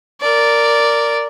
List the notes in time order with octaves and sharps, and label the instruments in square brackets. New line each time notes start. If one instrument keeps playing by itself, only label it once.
[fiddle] A#4 D5